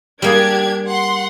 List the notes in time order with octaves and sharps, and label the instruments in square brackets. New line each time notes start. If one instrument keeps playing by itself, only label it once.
[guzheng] G3 A#3 G#4 [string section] D4 G4 G#6
[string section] F#5 C6